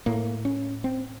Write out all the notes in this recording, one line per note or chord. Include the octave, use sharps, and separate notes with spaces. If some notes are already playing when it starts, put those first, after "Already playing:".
A2 A#3
C#4
C4